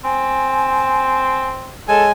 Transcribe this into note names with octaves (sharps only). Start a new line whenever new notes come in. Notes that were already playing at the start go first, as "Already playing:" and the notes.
C4 G#5
G#3 A4 C#5 G#5